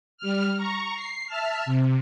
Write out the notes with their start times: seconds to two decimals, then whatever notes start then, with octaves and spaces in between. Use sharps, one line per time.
0.17 G3 F6
0.56 A#5 C#6
0.96 C7
1.27 E5 A5 F6
1.66 C3